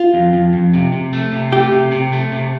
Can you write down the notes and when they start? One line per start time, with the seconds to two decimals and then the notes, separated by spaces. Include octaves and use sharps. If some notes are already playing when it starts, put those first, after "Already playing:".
Already playing: F4
0.14 F2
0.33 F2
0.53 F2
0.73 C3
0.92 C3
1.13 A3
1.32 C3
1.52 A3 G4
1.72 C3
1.91 C3
2.12 A3
2.32 C3